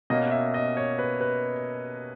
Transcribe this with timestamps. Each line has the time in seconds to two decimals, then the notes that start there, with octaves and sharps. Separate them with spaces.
0.10 B2 A#3 C#4 D#5
0.31 E5
0.54 D#5
0.77 C#5
0.99 B4
1.21 B4